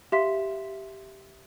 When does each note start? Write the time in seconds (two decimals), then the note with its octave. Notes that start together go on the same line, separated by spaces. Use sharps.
0.12 G4 E5 F5 C6 B6